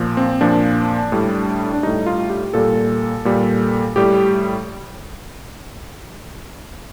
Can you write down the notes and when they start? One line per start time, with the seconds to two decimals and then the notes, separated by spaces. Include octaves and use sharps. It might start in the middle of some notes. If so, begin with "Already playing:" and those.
Already playing: A#2 F3
0.17 C4
0.41 A#2 F3 D4
1.12 A2 G3
1.73 D4
1.83 A2 G3 D#4
2.06 F4
2.30 G4
2.54 A#2 G3 A4
3.25 A#2 G3
3.96 A2 G3 G4